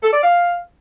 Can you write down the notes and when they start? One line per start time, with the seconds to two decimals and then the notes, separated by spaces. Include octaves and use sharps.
0.03 A4
0.13 D5
0.22 F5